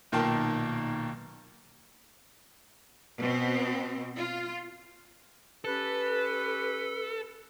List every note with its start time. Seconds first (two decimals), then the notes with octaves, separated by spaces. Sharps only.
0.12 B1 A#2 D#3 A#3 G5 A5
3.19 B2 B3 C4
4.16 F4
5.65 C#4 G4 A4 B4